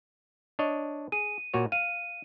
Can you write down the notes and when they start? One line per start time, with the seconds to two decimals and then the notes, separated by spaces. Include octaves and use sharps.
0.59 D4 C#5 D#5
1.12 G#4 D#7
1.54 A#2 F#4 C#5
1.72 F5 D#7